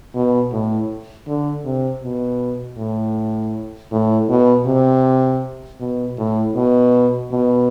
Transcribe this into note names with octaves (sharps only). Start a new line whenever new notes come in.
B2
A2
D3
C3
B2
A2
A2
B2
C3
B2
A2
B2
B2